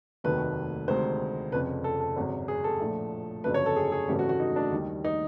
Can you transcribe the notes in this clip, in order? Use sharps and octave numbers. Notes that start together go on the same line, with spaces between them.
F1 D#2 D#3 F#3 A3 B4
D2 C3 D#3 G#3 C5
F1 F2 C#3 B4
A4
A4
G#1 F#2 C#3
G#4
A4
A#1 A2 F3 A3
G1 F2 C#3 F#3 A3 B4
C#5
A4
G#4
G#4
G#1 F#2 C#3 E3 A3 G4
F#4
F#4
D#4
D4
D#2 D#3 G3
D#4